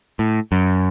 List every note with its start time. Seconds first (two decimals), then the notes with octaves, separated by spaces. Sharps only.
0.19 A2
0.52 F#2